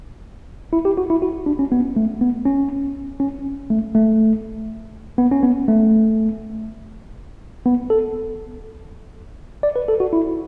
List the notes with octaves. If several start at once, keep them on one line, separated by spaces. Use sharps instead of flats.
E4
G4
F#4
E4
F#4
D4
C#4
B3
A3
B3
C#4
C#4
A3
A3
B3
C#4
B3
A3
B3
A4
D5
B4
A4
F#4
E4